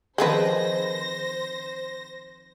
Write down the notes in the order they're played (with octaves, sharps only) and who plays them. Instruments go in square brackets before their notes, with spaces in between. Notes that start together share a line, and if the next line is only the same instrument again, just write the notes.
[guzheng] D#3 F3 C4 [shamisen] G#4 B4 [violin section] C5 A#6